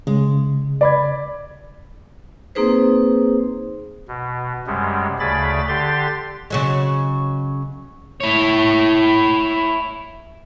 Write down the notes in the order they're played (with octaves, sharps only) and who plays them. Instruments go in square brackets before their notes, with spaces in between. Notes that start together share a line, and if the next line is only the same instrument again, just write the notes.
[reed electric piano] C#3 [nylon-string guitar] G#3
[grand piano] D5 B5 G#6
[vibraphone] A#3 C4 D#4 G#4 B4 C5
[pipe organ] B2
F#2 C3 G3 G#3
D2 C#3 G#4 D5 B5 A6
D3 G4 C6 A6
[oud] C#3 F#3 G#3
[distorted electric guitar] E4 C#5